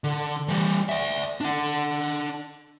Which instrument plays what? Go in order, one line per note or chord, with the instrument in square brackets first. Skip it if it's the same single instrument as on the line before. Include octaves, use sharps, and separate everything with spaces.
[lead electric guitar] D3
E3 G3
D5 E5
D4 F#5